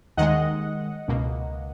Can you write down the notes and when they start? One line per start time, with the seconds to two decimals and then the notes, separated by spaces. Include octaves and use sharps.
0.17 D#2 D#3 G#3 D#5 F#5
1.08 C#2 B2 A#3